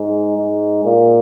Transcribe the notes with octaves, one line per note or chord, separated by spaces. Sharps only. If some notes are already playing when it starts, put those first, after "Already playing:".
Already playing: G#2
G#2
A#2